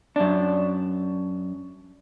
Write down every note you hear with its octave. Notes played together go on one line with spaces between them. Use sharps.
F#2 D4